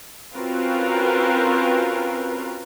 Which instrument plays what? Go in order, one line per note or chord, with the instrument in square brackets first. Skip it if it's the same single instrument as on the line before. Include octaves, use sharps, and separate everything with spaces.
[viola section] C4 C#4 F4 F#4 A#4 B4